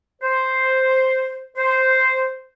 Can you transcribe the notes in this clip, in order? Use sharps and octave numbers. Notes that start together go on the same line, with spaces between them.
C5
C5